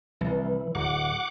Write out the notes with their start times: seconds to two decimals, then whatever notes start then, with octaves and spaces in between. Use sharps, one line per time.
0.21 C2 E3
0.75 D1 F#5 D6